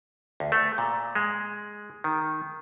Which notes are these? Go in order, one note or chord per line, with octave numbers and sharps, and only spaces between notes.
D2
A3
A#2
G#3
D#3